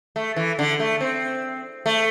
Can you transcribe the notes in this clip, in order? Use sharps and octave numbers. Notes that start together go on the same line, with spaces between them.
A3
E3
D3
A3
C4
A3